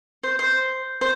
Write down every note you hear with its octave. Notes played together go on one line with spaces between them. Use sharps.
C5
C5
C5